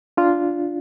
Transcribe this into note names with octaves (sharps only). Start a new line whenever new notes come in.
D4 F4